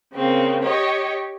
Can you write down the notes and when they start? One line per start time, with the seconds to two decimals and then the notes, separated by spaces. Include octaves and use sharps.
0.13 C#3 A#3 C4
0.62 G4 C#5 D#5